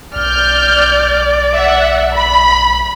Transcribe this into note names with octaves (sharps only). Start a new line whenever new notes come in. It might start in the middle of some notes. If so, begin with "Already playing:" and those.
B1 D5 F6 G6
E5 F#5
B5